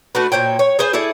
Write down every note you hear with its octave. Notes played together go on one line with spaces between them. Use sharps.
A3 D4 F#4 B4
A#2 C5 C#5 G5
C#5
G#4 B4 C5 G#5
E4 G#4 A4 D5